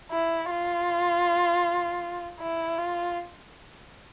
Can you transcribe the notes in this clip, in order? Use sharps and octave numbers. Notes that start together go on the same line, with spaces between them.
E4
F4
E4
F4